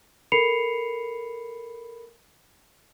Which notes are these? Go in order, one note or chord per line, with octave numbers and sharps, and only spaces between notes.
A4 A#4 B5 C7 C#7 F7